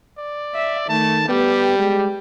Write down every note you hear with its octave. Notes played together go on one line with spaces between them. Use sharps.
D5
E5
D#3 A3 A5
G3 B3 G4
G#3